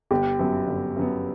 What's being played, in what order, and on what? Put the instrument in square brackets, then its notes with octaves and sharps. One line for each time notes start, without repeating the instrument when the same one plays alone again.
[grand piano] G1 [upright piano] G4
[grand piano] F#2 F#3 B3
G1
F#2 F#3 B3